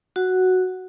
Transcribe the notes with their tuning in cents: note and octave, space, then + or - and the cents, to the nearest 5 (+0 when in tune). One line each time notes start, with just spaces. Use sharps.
F#4 +0 F#5 +0